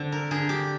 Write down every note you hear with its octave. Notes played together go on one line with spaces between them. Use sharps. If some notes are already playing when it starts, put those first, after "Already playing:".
Already playing: D3 C4
A#4
D3 G#4
G4